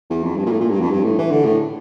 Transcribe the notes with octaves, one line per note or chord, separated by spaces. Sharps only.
E2
F2
G2
A#2
A2
A#2
G2
F2
G2
A2
E3
D3
A2